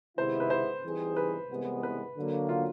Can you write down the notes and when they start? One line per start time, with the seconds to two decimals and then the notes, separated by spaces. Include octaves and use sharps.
0.17 C3 D#3 G#3 B3 E4 C5
0.40 B4
0.50 C5
0.84 E3 G3 C4 D#4 G#4
1.17 B4
1.50 C2 C3 E3 G#3 B3
1.83 B4
2.16 D3 F#3 A#3
2.49 F4